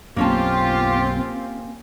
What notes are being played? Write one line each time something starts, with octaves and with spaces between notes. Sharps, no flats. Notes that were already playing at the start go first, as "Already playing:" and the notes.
B1 F#2 A#3 C4 C#4 F4 G4 A5